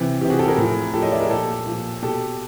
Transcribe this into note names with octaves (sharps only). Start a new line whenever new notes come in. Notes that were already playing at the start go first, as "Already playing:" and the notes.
Already playing: C3 E3
C3 E3 G4
F#4 G#4
G4 A4
G#4 A#4
A2 F3
A2 F3 G4 A4
C#5 D#5
D5 E5
G#4 A#4
A#2 F3 G4 A4
A#2 F3
B2 G4 A4